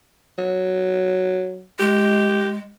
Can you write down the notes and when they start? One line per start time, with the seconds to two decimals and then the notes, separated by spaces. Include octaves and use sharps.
0.38 F#3
1.80 G#3 G4